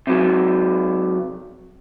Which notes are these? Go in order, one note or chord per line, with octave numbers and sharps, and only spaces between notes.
C3 F#3